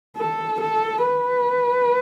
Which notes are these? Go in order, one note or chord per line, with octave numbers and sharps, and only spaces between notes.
A4
A4
B4